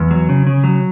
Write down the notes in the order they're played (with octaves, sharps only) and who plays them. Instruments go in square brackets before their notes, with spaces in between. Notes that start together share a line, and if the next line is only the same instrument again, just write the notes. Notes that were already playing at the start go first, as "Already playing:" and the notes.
Already playing: [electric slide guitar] E2
F#3
C#3
C#3
F#3